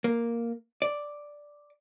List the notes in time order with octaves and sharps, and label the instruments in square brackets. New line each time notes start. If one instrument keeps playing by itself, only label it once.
[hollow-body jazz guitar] A#3
D5